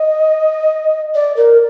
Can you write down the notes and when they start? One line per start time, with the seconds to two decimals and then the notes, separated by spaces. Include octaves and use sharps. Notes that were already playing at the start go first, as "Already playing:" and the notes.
Already playing: D#5
1.15 D5
1.36 A#4